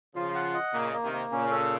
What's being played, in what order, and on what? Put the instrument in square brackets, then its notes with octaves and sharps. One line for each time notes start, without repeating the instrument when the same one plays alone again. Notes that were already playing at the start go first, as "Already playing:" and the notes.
[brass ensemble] C#3 F3 [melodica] F4
[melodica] F#5
D#5
[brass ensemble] A#2 C#3 [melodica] A#3
[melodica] A#3
[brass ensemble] C3 D#3
[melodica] A#3
[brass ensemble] A#2 C#3 [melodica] C#4
[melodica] A4